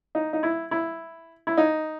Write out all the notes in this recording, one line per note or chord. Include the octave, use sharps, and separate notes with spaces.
D#4
D#4
E4
E4
E4
D#4